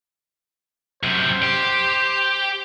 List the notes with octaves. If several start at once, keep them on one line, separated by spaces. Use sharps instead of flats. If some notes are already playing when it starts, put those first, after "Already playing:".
F#2 C3 C5
G4